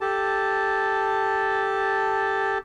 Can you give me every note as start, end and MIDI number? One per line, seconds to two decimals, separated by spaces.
0.01 2.58 67
0.01 2.58 69
0.01 2.58 81